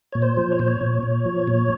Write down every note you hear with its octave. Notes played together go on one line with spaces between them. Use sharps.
A#2 C#5
C5
F3
C#5
A#2 C5
C#5
A#2
A#2
F3
A#2